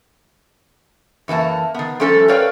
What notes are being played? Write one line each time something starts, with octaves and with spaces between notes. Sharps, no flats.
F#2 E3 A#3 A5
D#3 B3
F3 G3 A3 C#4 A4
A#4 B4 C#5 D5 F5 G5